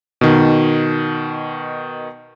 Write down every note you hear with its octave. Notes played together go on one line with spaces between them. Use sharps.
B2 D#3